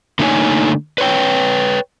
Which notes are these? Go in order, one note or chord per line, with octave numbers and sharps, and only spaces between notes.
D3 A3 A#3 D#4 C#5 G#5
B4 C#5 G5